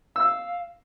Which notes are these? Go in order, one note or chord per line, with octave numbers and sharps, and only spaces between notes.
F5 E6